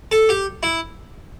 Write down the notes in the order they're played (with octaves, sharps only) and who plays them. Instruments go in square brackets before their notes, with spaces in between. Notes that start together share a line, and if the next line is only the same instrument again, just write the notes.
[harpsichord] A4
G4
E4